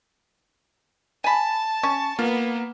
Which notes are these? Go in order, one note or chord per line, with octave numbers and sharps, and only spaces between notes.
G#5 A5 B5
C#4 C#6
A#3 B3 F4